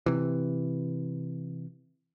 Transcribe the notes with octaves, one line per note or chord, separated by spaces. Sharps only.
C3 E3